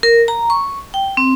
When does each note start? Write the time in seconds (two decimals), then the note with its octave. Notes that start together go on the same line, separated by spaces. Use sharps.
0.03 A#4
0.28 A#5
0.50 C#6
0.94 G5
1.17 C4